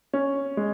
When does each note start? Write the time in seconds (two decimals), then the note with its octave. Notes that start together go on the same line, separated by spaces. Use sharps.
0.13 C#4
0.57 G#3